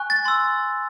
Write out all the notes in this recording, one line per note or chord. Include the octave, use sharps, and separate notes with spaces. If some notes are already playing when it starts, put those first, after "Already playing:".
Already playing: G#5 C#6 F#6
A6
C6 E6